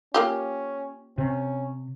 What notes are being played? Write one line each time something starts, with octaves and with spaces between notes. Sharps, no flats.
A#3 C#4 F4 G4
C3 C#4